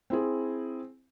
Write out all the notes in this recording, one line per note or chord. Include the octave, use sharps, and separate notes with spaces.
C4 E4 G#4